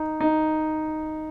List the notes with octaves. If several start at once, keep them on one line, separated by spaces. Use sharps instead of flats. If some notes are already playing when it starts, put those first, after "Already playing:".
Already playing: D#4
D#4